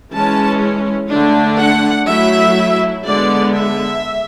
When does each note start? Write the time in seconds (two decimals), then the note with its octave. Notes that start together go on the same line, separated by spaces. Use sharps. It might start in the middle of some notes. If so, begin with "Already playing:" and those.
0.12 E3 G#3 C#4 A5
1.09 D3 A3 D4
1.58 F#5
2.06 F#3 A3 E4 E5
3.04 D3 G#3 B3 D5
3.53 E5